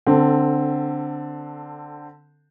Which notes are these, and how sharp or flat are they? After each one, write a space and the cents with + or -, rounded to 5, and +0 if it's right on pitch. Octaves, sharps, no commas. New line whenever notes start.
D3 +0 C4 +0 A4 +25